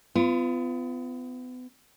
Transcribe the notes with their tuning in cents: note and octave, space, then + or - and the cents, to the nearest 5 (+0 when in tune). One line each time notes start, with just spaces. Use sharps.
B3 +35 F4 -25